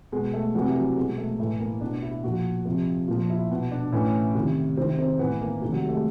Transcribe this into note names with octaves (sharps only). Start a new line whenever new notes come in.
B2 G#3
A3
C3 E3 F#3
F#3
B2 G#3
A3
A2 E3 A3
A#3
B2 D4
E4
A#2 F3 F#4
C3 F3
A#2 F3 F4
E4
B2
D4
A2 E3 C#4
C3 D#3
C3 D#3 C4
C4
A2 E3 B3
A#3
C3 D#3 A3
F#3
G3
A3
G#3